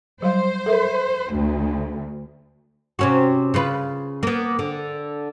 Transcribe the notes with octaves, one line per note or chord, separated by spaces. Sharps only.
F#3 G3 C5 F5
A4 A#4 E5
D2
C3 C#4 F#4
C#3 F4 B4
A#3 B3
D3